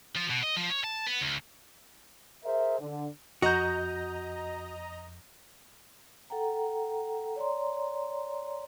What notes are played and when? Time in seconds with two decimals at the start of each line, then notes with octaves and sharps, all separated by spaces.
0.16 F3
0.30 B2
0.43 D#5
0.56 F3
0.70 C#5
0.84 A5
1.07 B3
1.21 C#2
2.45 G#4 A#4 C5 E5
2.80 D3
3.42 F2 F#4 D#5 A#5 G6
6.30 A4 F#5 G5 A#5
7.36 C#5 D5 A#5 C6